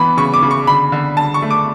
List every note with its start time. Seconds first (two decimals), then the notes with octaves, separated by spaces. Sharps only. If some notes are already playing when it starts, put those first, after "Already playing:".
Already playing: E3 B3 B5
0.17 C#3 C#6
0.34 D6
0.42 C#3
0.51 C#6
0.67 D3 B5
0.92 D3
1.17 D3 A5
1.34 C#6
1.42 A3
1.50 D6